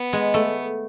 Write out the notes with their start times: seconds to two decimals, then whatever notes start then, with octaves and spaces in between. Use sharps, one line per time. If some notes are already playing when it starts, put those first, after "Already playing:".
Already playing: B3
0.13 G#3
0.34 A3